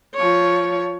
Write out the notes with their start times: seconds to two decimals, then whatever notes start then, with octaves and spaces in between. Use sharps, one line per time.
0.15 F3 C#5